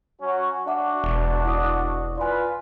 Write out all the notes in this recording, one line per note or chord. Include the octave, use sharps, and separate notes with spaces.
F#3 C#4 F#4
D4 F#4 E5 F#5 D6
E1
E4 D5 D#6
F4 B4 D5 G#5